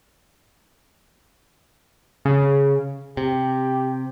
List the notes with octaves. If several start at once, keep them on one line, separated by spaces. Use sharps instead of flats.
C#3
C3 G4